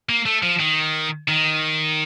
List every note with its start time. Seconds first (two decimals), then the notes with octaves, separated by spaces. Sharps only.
0.09 A#3
0.26 A3
0.43 F3
0.60 D#3
1.28 D#3